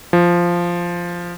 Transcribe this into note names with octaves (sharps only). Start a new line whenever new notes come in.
F3